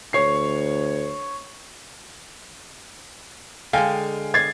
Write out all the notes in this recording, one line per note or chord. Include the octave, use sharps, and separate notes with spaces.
D2 C#5 C7
D3 G#3 F5 G5 G#5
G#6 A6 C7